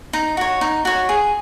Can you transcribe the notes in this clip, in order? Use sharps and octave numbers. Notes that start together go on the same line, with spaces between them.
D#4
F#4 C#5
D#4
F#4 C#5
G#4